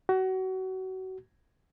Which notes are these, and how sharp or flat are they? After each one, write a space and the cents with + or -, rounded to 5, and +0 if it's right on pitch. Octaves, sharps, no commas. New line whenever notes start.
F#4 +25